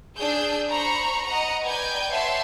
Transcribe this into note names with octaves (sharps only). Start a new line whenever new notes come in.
D4 G#4 E6 G6
C5 A#5 B5 C#6
D#5 F#5 A#5
B4 D5 G5 G#5 G6 G#6
C#5 E5 F#5 A5 C6